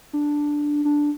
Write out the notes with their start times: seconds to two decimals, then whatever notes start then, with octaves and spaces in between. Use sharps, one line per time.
0.13 D4
0.85 D4